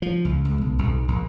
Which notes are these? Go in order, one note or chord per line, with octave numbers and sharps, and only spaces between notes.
F3
C#2
C#2
B1
B1
A#1